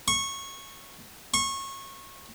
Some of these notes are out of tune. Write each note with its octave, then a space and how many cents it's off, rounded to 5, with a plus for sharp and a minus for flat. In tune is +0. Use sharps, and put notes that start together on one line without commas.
C#6 -15
C#6 -25